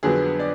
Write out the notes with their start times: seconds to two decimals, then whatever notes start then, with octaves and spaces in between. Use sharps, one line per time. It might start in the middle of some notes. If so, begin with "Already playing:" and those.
0.03 F2 D3 F#3 B3 G#4
0.39 D5